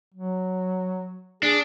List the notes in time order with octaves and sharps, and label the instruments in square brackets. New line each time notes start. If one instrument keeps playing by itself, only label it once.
[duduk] F#3
[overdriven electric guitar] D4 [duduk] G#4